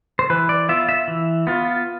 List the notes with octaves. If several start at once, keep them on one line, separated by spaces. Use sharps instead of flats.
C5
E3 B4
D5
B3 F4 E5
E5
E3
B3 F4